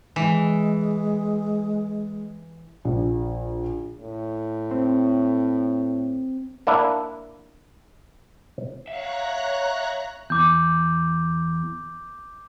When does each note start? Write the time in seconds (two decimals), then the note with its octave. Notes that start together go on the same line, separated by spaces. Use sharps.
0.16 E3 G#3
2.85 A#1
4.00 A2
4.71 C4
6.67 A#3 D4 E4
8.87 C#5 E5 F5 A#5 F#6
10.30 E2 D6 G6